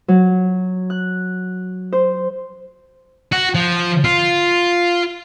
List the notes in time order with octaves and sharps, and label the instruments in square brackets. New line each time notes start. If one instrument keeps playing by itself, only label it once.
[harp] F#3
F#6
C5
[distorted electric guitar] F#4
F3
F4